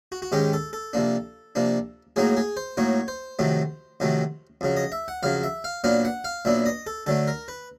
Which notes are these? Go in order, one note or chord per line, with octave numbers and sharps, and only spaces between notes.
F#4
F#4
G#2 D#3 G#3 C#4 G4
A4
A4
C3 F3 A#3 D4
C3 F3 A#3 D4
A2 F#3 A#3 D#4 G#4
G#4
C5
A2 F#3 A#3 D#4 C#5
C5
F2 C3 D#3 F#3 A3
F2 C3 D#3 F#3 A3
F2 C#3 F#3
D#5
E5
F#5
F2 C#3 F#3 F5
E5
F5
A#2 F#3 B3 D4 F5
F#5
F5
A#2 F#3 B3 D4 E5
D#5
A4
D3 F#3 A3 A4
A#4
B4